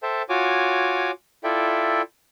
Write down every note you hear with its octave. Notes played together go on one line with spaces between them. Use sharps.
A4 C5 E5 G5 A5
F4 F#4 C#5 G#5 D6
E4 F4 A4 D5 E5 G5